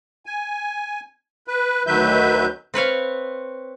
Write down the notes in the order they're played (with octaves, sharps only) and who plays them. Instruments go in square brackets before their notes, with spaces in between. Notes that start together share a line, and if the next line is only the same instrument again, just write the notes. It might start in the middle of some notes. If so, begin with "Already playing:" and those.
[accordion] G#5
B4
D2 D#3 F#3 B4 E5 G6
[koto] C4 B4 C#5 F5